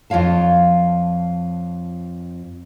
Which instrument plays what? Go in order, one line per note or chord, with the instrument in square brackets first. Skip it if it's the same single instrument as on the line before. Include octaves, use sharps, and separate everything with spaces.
[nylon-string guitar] F2 F4 C#5 F5 A5